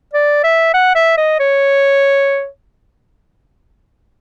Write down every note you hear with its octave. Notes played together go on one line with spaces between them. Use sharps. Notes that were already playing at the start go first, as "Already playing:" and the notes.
D5
E5
F#5
E5
D#5
C#5